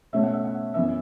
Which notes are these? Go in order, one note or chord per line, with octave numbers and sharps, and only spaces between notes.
B2 A3 C#4 E5
F#5
E5
F#5
F#2 E3 B3 E5